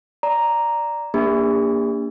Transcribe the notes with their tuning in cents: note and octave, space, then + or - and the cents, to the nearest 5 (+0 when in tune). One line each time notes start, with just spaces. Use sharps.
D5 +0 A#5 +0
A#3 -5 D4 -20 G4 +40